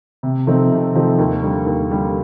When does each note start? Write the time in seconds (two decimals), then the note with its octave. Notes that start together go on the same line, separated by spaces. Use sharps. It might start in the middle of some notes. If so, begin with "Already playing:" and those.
0.23 C3
0.47 F3 A3 C4 D#4
0.72 C3
0.95 F3 A3 C4 D#4
1.19 D#2
1.43 D3 G3
1.66 D#2
1.91 D3 G3